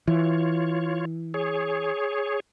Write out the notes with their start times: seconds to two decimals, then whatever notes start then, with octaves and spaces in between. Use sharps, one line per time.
0.08 E3 F4 C#5
1.34 G#4 C#5